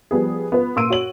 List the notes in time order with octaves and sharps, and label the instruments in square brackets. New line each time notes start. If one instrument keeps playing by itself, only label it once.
[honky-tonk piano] F3 G3 B3 G#4
B3 F4 B4
A#2 C6 E6 D7 D#7
F#4 C#5 F#7